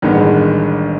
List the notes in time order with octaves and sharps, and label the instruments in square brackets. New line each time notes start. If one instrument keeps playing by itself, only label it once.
[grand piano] A1 G2 D#3 G#3 B3